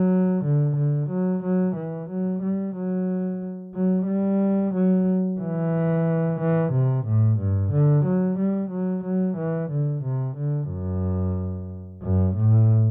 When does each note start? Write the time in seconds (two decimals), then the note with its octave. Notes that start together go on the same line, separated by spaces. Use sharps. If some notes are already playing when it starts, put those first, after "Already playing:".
Already playing: F#3
0.44 D3
0.76 D3
1.09 F#3
1.43 F#3
1.75 E3
2.09 F#3
2.42 G3
2.75 F#3
3.75 F#3
4.07 G3
4.74 F#3
5.40 E3
6.39 E3
6.72 C3
7.05 A2
7.38 G2
7.71 D3
8.04 F#3
8.38 G3
8.70 F#3
9.03 F#3
9.36 E3
9.70 D3
10.03 C3
10.36 D3
10.69 F#2
12.02 F#2
12.35 A2